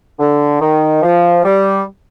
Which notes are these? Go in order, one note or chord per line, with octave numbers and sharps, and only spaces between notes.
D3
D#3
F3
G3